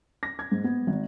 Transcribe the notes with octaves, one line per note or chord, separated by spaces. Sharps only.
A#6
G#6
G#2
B3
G#1